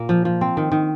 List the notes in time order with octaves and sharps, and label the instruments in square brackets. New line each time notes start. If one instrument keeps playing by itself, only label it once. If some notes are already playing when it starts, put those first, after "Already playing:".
Already playing: [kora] A#2 A#3
F3
F3
C4
D#3
D#3